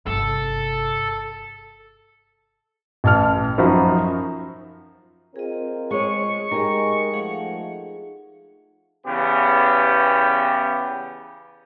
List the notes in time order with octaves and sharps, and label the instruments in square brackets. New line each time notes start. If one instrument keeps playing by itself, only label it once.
[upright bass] G1 C3 [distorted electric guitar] A4
[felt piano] A1 A5 F6
F#2 F3 D#4 F#4 C5 B5
[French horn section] C4 F4 A#4 [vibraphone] G#4 D#5
[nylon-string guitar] G#3 C#5 [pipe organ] C#6
[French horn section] G#3 [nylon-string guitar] D#4 G4 [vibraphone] G#4 A#4
[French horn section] F3 A3 [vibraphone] G#4 F5 F#5
[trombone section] E2 C#3 B3 G4